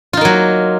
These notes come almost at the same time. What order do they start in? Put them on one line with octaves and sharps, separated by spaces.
F4 D#4 A#3 F#3